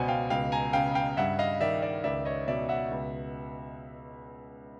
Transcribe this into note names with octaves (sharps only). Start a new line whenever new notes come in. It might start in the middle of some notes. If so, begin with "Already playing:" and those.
Already playing: C#2 B2 C5 D5 F#5 G#5
F5 G5
C#2 F5 G5
G#5 A#5
C#3 F5 G5
F5 G5
G2 E5 F#5
D#5 F5
D#3 D5 E5
D5 E5
C#2 D5 E5
C#5 D#5
B2 D5 E5
E5 F#5
C#2